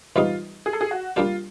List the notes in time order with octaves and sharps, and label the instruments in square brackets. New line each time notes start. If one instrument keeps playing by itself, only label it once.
[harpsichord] G#2 E3 G3 B3 D#4 [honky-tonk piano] F4
[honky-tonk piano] G#4
A4
G#4
F#4
[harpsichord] G3 A#3 D4 G4 [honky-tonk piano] F4